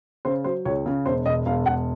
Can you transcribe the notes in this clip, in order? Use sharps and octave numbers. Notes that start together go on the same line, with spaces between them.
C#3 C5
F#3 C5
C#2 C#5
C#3
E1 C5
E1 D#5
E1 F5
E1 F#5